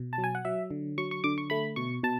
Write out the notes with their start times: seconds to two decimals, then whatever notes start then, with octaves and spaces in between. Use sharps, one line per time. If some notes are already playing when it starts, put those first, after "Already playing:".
Already playing: B2
0.13 A5
0.18 F#3
0.24 G#5
0.35 F#5
0.45 F#3 E5
0.71 D3
0.98 F#3 C#6
1.11 C#6
1.24 D3 D6
1.38 C#6
1.50 A3 B5
1.76 B2 C#6
2.03 B2 A5